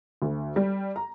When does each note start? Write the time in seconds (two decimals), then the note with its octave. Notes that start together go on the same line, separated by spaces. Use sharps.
0.22 D2
0.56 G3
0.96 A#5